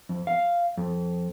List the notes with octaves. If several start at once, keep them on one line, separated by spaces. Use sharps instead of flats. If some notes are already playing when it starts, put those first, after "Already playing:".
F2
F5
F2